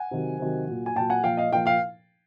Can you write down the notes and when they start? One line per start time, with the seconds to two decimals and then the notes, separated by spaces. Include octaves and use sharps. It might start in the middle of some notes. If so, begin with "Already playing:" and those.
Already playing: F#5 G#5
0.11 C3 D#3 F#3
0.39 C3 D#3 F#3
0.67 A#2 F#3
0.86 G#5
0.95 A#2 F#3 G5 A5
1.10 F#5 G#5
1.23 A#2 F3 F5 G5
1.37 D#5 F5
1.52 A#2 F3 F5 G5
1.66 F5 G5